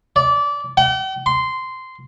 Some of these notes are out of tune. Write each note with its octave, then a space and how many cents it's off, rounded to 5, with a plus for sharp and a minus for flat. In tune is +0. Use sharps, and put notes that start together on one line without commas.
D5 -20
G5 -45
C6 -10